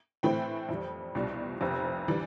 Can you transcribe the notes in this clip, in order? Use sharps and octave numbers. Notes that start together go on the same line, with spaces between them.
A2 E3 A3 C4 E4 G5 B5
F2 E3 G3
C2 B2 G3 D4 F4
F1 F2 C3
E3 G3 D4